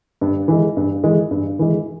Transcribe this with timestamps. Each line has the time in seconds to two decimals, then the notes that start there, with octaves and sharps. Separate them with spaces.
0.21 G2
0.48 E3 G#3
0.77 G2
1.04 E3 G#3
1.31 G2
1.59 E3 G#3